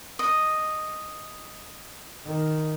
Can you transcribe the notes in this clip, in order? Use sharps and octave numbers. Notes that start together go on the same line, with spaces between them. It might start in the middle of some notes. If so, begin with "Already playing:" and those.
D#5
D#3